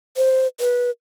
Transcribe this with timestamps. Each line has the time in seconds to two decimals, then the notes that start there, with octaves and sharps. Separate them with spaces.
0.17 C5
0.60 B4